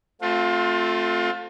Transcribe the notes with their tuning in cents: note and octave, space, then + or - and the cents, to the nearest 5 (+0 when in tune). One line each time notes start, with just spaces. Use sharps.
A3 +0 C4 +10 F4 +30